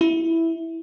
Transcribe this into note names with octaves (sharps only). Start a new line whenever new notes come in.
E4